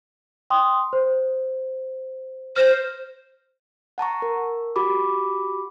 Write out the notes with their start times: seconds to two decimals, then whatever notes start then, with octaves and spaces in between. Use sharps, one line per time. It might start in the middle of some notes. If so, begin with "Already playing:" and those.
0.50 G5 C6 D#6
0.93 C5
2.56 C5 F6 A#6
3.98 F#5 A5 A#5 C#6
4.22 A#4
4.76 F#4 G4 B5 D6